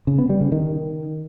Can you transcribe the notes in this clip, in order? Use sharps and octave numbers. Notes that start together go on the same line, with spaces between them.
C#3
B3
G3
C#3
D#3